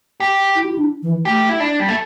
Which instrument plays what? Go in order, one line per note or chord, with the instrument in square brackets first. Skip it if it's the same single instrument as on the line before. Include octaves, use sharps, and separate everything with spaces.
[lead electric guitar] G4
[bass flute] E4
G4
E4
D4
E3
[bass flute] A3 [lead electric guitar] G4
[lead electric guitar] E4
D4
G3
A3